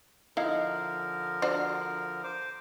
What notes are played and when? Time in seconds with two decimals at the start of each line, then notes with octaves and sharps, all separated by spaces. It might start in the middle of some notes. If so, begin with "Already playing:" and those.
0.37 D3 F3 D#4 E4 A#4 F5
1.42 D4 F#4 C5
2.24 C5 D6